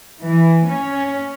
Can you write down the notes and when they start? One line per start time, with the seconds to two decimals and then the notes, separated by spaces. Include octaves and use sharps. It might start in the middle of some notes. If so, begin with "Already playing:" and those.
0.22 E3
0.66 C#4